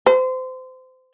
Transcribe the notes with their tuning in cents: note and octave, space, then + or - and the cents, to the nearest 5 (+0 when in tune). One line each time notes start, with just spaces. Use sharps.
C5 -25